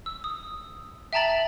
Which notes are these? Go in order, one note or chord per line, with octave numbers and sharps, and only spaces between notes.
E6
D#6
E5 G5 A5 A#5 A6 F#7